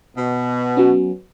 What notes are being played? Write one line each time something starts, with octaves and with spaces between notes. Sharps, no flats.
B2
F#3 B3 C#4